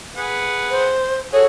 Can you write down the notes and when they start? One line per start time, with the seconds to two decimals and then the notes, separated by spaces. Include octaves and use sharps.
0.16 G#4 B4 F#5
0.70 C5
1.33 F#4 G#4 A4 C#5